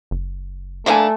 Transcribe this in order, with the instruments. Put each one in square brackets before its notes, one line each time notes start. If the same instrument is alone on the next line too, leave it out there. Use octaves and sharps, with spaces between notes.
[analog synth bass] F#1
[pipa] D3 A#3 D4 [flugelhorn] A3 [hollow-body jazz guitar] E5 G#5